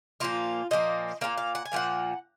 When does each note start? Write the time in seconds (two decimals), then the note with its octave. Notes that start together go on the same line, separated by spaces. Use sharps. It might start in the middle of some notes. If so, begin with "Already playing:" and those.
0.20 A#2 F3 A#3 F4
0.71 A#2 F3 A#3 D#5
1.21 A#2 F3 A#3 F5
1.38 F5
1.55 F#5
1.65 G#5
1.72 A#2 F3 A#3 F#5